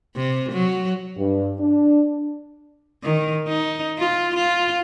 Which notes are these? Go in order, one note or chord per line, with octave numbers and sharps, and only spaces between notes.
C3
F#3
G2
D4
D#3
D#4
F4
F4